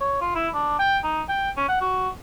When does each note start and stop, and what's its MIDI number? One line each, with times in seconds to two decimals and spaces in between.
0.01 0.16 73
0.21 0.31 65
0.35 0.49 64
0.54 0.79 62
0.79 0.98 79
1.04 1.22 63
1.29 1.50 79
1.57 1.65 61
1.68 1.80 78
1.81 2.09 66